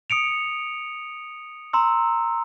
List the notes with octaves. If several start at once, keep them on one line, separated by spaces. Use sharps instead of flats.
D#6 C#7 D7 F7
A#5 C6 E6